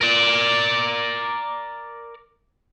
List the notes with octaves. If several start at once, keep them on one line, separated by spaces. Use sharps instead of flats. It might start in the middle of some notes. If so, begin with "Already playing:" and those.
A#4 D5